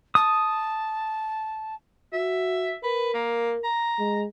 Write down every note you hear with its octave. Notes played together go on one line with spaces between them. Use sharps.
A5 D#6
F#4 E5
A#4 B4
A#3
A#5
G#3